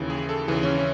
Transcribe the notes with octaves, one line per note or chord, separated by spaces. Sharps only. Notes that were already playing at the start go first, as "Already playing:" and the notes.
Already playing: D#2 C#3 E3
G#4
A4
D#2 C#3 E3 G#4
C#4
C#4